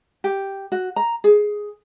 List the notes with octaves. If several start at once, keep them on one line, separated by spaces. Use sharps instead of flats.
G4
F#4
A#5
G#4